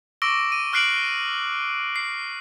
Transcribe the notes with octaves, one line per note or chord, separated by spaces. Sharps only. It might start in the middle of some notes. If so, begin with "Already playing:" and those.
C#6 D6 E6 A#6 D7 G7
D#7
C#6 F6 F#6 C7 D7 F#7
C7